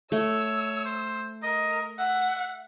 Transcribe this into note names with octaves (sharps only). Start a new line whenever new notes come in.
A3 C#5 E6
C5
A#4 D#5
E5 F#5